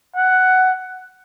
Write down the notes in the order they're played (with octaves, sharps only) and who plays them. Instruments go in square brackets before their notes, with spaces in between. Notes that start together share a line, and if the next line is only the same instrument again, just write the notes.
[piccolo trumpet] F#5